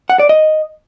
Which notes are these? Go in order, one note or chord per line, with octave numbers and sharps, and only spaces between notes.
F#5
D5
D#5